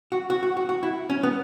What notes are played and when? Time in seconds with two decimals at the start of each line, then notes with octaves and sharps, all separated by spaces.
0.12 F#4
0.30 F#4
0.43 F#4
0.57 F#4
0.69 F#4
0.83 E4
1.10 C#4
1.23 B3